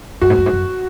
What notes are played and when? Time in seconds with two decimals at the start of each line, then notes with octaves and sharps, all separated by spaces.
0.21 F#2 F#4
0.30 G#2
0.38 F#2
0.46 G#2
0.54 F#2